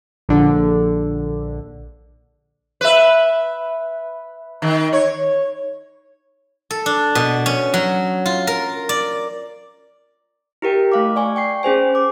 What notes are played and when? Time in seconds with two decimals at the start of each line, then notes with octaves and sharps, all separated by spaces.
0.29 A#1 D3
2.81 B4 E5
4.62 D#3
4.93 C#5
6.71 A4
6.86 D4
7.15 B2
7.46 C#4
7.74 F#3
8.26 F4
8.47 A#4
8.89 D5
10.62 E4 G4 A#4 G5
10.92 A3 F5 D6
11.16 D5 G#5 C#6
11.36 G5 C#6 C7
11.63 C#4 G#4 C5 G#5
11.95 D6